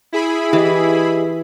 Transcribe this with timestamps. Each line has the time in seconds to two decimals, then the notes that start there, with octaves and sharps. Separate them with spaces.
0.12 E4 G#4 B5
0.53 E3 G4 D#5